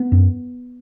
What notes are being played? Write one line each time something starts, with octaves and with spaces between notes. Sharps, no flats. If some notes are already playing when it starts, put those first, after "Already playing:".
Already playing: B3
F#2